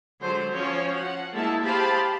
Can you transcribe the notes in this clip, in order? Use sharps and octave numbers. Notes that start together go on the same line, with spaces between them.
D3 F#3 G#3 C5
F3 C#4 F#4 C5 C#5
F#4 F#5
G#3 A#3 E4 E5 A5
G4 G#4 C5 F5 A5 B5